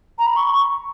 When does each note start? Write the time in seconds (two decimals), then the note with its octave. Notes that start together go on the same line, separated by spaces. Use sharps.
0.19 A#5
0.26 B5
0.36 C#6